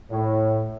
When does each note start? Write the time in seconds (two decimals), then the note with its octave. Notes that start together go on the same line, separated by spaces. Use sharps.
0.10 A2